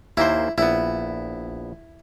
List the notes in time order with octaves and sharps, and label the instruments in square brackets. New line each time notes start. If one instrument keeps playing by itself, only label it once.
[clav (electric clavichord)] D#2 A#3 C5 [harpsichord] E4
[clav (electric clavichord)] A#1 B3 [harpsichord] E4